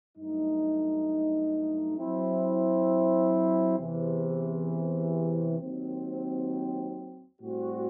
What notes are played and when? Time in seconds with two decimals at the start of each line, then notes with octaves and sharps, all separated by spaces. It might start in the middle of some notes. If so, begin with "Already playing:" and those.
0.17 G2 F#3 A3 D#4
1.98 F#3 C4 E4
3.79 E2 C3 E3
5.60 D#2 D#3 F#3 C4
7.42 A2 G3 C4 F#4